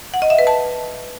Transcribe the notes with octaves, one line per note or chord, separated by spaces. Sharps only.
F#5
D#5
E5
B4
A5